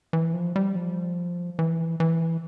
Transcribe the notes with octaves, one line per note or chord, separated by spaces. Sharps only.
E3
F3
G3
F3
E3
E3